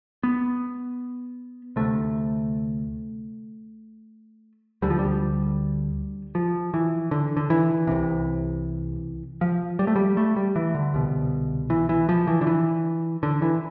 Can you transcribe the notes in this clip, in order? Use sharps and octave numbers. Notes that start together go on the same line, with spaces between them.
B3
D2 C3 A3
D2 D3 G3
F3
G3
F3
E3
D3
D3
E3
C2 C3
F3
G3
A3
G3
A3
G3
E3
D3
C2 B2
E3
E3
F3
E3
D3
E3
D3
E3